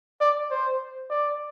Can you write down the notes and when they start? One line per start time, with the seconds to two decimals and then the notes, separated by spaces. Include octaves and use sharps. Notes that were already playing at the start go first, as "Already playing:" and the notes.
0.21 D5
0.51 C5
1.10 D5